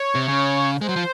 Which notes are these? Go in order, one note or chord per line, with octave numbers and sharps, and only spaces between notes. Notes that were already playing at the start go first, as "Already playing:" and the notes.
Already playing: C#5
C3
C#3
G#3 C5
F#3
F3